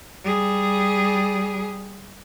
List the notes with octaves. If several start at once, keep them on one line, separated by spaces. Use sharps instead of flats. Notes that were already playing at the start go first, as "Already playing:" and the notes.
G3 G#4